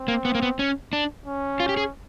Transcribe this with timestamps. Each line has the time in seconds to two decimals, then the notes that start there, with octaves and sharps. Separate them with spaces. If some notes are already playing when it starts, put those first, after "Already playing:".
Already playing: C4
0.08 A#3
0.25 B3
0.35 A#3
0.42 B3
0.59 C#4
0.93 D4
1.26 C#4
1.60 F4
1.69 G4
1.77 G#4